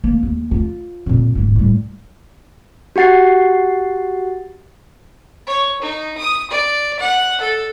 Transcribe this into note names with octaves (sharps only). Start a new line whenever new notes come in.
A#3
D#2
F4
F2 A#2
D#1 G#2
A2 G3
F#4 G4 F#5 A6 C7
C#5
D#4
D#6
D5
F#5
A4